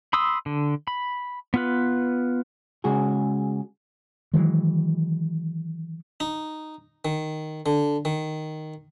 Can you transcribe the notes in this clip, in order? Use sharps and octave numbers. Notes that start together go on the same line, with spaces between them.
B5 C6 D#6 E6
D3
B5
B3 F4 B4
C#3 G#3 F#4 G#4
D#3 E3 F#3 G#3
D#4
D#3
D3
D#3